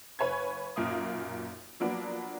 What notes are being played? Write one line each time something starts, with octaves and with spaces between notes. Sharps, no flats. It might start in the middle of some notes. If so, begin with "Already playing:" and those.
F#1 B4 C#5 G#5 G#6
B1 F#2 A#2 A#3 F5 D#6
F3 F#3 A#3 B3 D4